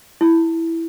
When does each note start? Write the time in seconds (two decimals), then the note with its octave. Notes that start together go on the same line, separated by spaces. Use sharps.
0.21 E4